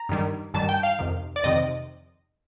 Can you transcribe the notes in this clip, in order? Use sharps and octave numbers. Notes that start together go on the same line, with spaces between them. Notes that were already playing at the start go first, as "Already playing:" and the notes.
Already playing: A#5
G2 D#3 G3
G2 D#3 G3 A5
G5
F5
F2 C3 D#3
D5
F2 C3 D#3 D#5